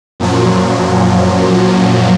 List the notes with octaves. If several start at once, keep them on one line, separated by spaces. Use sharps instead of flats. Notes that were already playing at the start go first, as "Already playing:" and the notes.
F#2 A#2 F3 F#3